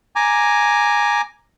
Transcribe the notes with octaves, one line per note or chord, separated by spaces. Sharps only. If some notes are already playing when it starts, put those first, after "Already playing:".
G#5 A#5 D6